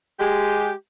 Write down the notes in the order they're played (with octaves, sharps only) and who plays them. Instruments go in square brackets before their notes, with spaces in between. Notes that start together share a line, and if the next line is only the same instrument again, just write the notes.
[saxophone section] G#3 G4